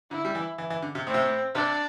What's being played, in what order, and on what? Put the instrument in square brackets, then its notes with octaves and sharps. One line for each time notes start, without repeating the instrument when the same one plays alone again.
[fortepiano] D3 [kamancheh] E4
[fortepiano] G3
E3
E3
E3
D3
C3
[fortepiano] A2 [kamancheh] C4
[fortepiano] C3
A2
[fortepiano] C3 [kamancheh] D4